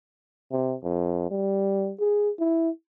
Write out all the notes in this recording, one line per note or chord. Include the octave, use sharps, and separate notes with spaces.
C3
F2
G3
G#4
E4